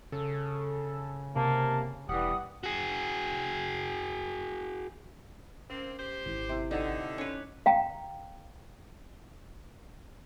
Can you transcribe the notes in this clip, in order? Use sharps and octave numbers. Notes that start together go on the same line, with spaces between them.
C#3 A4
C3 A#3 A5
E1 E3 G3 F#5 D#6
F#4 G#4
A#3 C4 C#4
G4 C5
G#1 E4
C3 E4 C6
D3 D#4 D5 F#5
C#4 B4 C#5
F5 G5 A#5